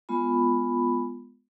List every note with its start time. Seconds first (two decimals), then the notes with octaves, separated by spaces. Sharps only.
0.09 G#3 B3 F4 B5